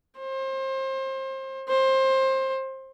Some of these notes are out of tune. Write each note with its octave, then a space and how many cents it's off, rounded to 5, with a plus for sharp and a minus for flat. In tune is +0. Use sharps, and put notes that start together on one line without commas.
C5 +30
C5 +20